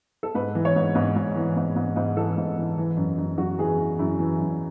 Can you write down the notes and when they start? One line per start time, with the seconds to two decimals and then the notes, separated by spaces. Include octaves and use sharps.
0.23 A4
0.35 G#2 B4
0.55 E3
0.65 C#5
0.76 G#2
0.95 G#2
1.16 G#2
1.36 E3
1.56 G#2
1.76 G#2
1.96 G#2
2.17 E3 A4
2.37 G#2
2.58 E3
2.78 E3
2.97 F#2
3.18 F#2
3.37 F#2 F#4
3.59 E3 G#4
3.79 E3
3.99 F#2 E4
4.19 E3
4.39 F#2